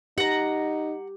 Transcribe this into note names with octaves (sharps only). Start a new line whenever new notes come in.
D#4 G4 F#5 A#5